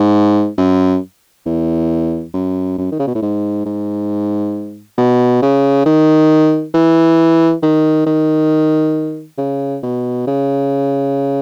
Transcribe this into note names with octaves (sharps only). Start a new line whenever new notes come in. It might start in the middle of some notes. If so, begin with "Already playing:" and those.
Already playing: G#2
F#2
E2
F#2
F#2
D#3
C#3
B2
A2
G#2
G#2
B2
C#3
D#3
E3
D#3
D#3
C#3
B2
C#3